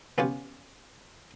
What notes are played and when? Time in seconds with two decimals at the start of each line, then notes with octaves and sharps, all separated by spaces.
0.18 B3 C#4 F4 G4